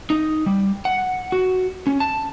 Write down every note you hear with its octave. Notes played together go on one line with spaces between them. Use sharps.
D#4
G3
F#5
F#4
C#4
A5